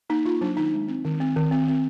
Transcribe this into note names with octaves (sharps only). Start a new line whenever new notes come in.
A#3 D#4
A#3 F4
F#3 D4
D#3 D#4
G#3
C4
D#3
C4
D#3
C4
C4